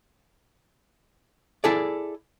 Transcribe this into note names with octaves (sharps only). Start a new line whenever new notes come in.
E4 G#4 A4 D5